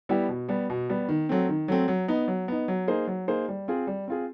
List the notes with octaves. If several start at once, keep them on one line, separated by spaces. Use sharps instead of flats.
G3 B3 E4 G4
B2
G3 B3
B2
G3 B3
D#3
F#3 A3 C4
D#3
F#3 A3 C4
F#3
B3 D#4
F#3
B3 D#4
F#3
A#3 D#4 G#4 C5
F#3
A#3 D#4 G#4 C5
G3
C4 F4 G#4
G3
C4 F4 G#4